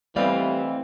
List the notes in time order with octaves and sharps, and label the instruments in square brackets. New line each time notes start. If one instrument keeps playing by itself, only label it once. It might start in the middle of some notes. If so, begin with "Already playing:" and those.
[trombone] E3 [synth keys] G3 B3 [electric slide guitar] A3 C4 [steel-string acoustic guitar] D5 D#5 F5